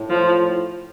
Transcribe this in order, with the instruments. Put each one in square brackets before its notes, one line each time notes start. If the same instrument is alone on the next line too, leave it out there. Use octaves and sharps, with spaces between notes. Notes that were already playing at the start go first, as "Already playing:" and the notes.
Already playing: [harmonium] A2
[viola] F3